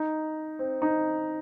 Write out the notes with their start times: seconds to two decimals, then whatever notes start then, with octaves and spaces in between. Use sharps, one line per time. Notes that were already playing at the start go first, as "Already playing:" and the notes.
Already playing: D#4
0.59 C4
0.82 D#4